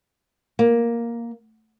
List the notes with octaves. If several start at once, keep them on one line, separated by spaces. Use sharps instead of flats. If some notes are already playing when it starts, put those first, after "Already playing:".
A#3